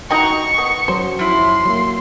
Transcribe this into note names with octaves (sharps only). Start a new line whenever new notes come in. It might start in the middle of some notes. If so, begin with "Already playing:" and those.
D#4 F#4 D#5 F#5 G5 A#5 C#6
B3
F#2 F#3 C5
F3 E4 C6
F#3 A3 A#3